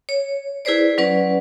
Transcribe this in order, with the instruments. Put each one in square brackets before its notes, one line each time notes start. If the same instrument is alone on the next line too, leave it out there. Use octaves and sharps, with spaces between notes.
[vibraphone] C#5
E4 G#4 B4 C5 D5
F#3 C#4 B4 D5